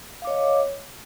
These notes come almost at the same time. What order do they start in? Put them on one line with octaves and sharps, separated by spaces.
F5 D6 C#5 D#5